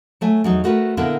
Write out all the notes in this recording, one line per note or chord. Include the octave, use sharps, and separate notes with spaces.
F#3 A3 G#5
E2 F#3 D#4
A3 F#4 A#4 B4
A#2 D3 A#3 B3 E4 A#4